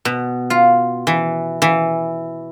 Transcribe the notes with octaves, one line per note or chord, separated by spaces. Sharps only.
B2
F4
E3
E3